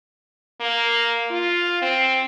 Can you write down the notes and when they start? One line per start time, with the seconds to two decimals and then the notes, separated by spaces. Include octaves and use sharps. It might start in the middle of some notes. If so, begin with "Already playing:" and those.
0.60 A#3
1.30 F4
1.82 C4